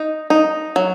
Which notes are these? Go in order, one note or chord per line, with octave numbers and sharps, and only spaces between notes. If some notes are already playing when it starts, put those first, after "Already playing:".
Already playing: D#4
D#4
F#3